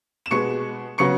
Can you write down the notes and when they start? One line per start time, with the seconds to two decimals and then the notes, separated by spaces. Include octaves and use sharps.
0.26 E7
0.31 B2 G#3 B3 C#6 C#7
0.98 C#3 F#3 B3 C#6 C#7